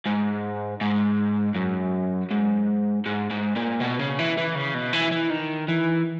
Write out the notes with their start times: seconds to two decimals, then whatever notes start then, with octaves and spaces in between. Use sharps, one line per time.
0.06 G#2
0.81 G#2
1.56 F#2
2.31 G#2
3.06 G#2
3.31 G#2
3.56 A#2
3.81 B2
3.99 C#3
4.19 E3
4.37 E3
4.55 C#3
4.74 B2
4.93 E3
5.12 E3
5.30 D#3
5.68 E3